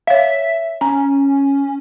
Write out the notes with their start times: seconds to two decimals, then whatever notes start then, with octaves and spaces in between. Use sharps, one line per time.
0.07 C#5 E5 F5
0.81 C#4 A#5